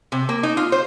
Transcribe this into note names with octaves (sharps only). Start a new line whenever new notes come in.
C3
A#3
D#4
F4
C5